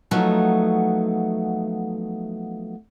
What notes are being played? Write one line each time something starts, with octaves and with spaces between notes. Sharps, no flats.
F3 F#3 A3 B3 D#4